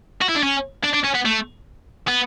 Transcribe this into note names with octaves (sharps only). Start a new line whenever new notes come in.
F#4
E4
D4
C#4
D4
D4
C#4
B3
A3
B3